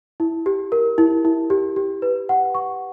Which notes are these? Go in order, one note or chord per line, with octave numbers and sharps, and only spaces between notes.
E4
G4
A#4
E4
E4
G4
G4
B4
F#5
C#6